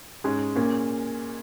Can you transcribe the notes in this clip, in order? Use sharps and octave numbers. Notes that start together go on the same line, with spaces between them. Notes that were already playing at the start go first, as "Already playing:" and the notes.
G#2 G#3 C#4 G#4
A#2 A#3 C#4